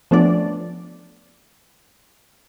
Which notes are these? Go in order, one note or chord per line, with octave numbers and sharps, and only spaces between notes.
F3 A3 B3 C#4 D4 D5